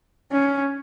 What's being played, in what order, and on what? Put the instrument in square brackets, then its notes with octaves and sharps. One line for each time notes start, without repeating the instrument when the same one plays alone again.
[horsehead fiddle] C#4